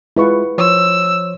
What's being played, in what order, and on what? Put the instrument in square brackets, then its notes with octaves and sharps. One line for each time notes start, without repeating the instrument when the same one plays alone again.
[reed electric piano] G#3 F4 [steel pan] E4 B4 C#6
[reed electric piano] F3 C5 C#5 [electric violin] E6